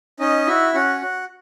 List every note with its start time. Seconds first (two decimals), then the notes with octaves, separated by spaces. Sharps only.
0.20 C#4 D#4 D#5
0.47 E4 F#4 E5
0.74 C#4 F#4 F#5
1.02 F#4